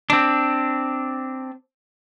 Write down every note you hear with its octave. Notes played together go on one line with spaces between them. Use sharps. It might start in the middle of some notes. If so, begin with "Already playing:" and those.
C4 D4